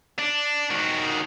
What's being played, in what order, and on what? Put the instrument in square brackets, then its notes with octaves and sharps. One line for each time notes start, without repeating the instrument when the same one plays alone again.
[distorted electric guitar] D4
D#3 F#4